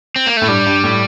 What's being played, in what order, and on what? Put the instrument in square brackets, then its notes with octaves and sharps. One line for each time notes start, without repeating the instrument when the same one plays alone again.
[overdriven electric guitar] C4
A#3
[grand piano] A2 [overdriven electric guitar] A3
[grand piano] G2 [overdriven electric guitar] G3
[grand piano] G2
A2